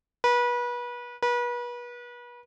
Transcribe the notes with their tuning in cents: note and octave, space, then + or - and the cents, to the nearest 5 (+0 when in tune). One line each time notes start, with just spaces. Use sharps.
B4 -30
B4 -35